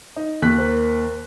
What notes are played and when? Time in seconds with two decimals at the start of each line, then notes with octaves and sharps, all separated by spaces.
0.16 D#4
0.42 D#2 F#6 B6
0.58 A#4 C5